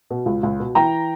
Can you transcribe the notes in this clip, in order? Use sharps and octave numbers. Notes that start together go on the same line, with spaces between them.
B2
C#2
C#2
B2
E3 G5 A#5